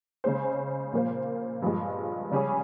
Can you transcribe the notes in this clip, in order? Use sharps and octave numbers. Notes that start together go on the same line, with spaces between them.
C#3 G#3 C#4 G#4 C5
A#2 F3 A#3 F4 C5
G2 F3 G#3
C#3 G3 C#4 G#4